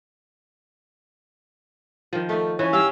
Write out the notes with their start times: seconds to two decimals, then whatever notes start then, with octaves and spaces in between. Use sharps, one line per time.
2.13 D#3 F3
2.29 A3 D#4
2.59 E3 C#4
2.73 G#2 G4 F5 G#5 E6